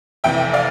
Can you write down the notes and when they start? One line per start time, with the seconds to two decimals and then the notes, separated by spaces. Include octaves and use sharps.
0.24 F1 F2 C3 E3 E5 G5
0.54 D5 F5